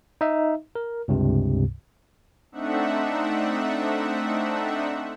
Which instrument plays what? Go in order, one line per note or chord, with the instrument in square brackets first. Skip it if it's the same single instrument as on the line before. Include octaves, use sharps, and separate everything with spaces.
[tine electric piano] D#4 D#5 E5
A#4
C#2 G2 C3
[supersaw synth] A3 C4 D4 D#4 E5 F#5